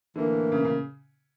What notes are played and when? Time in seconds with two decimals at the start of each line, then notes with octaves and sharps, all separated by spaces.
0.16 A2 D3 E3 A#3
0.52 C#3
0.64 C#3